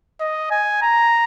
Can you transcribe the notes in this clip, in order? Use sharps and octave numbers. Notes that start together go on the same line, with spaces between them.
D#5
G#5
A#5